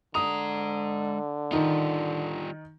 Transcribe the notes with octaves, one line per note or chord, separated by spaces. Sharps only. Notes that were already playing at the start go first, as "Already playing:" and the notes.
D3 G#3 A#5 D#6
D#3 G3 D#4 F4